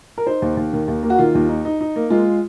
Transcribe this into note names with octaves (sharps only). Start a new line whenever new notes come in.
A#4
D#4 C5
D#2
D#2
D#3
D#2
A#3
F#4
D#3 F4
D#2
D#4
D#4
D#4
A#3
G#3 F4